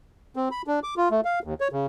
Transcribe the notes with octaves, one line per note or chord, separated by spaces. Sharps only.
C4
B5
D4
D6
F4
A3
F5
D#2
C#5
C#3